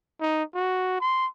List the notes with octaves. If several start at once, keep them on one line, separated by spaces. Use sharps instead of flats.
D#4
F#4
C6